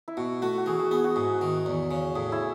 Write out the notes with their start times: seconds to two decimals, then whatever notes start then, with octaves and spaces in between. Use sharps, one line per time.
0.08 E4
0.17 B2 F#4
0.42 A3 F#4
0.58 F#4
0.66 E3 G#4
0.79 G#4
0.91 B3 G#4
1.04 F#4
1.16 G#2 G#4
1.41 D#3
1.66 E2
1.91 C#3
2.15 A2 G#4
2.32 E4